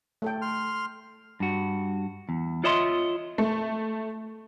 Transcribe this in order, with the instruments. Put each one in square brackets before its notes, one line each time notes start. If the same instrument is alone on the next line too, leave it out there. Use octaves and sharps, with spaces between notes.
[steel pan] A3 A4 G5
[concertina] C6 F6
[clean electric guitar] G2 F#4
E2
F4 C#5 D#5 E5 A#5 C6
[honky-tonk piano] A3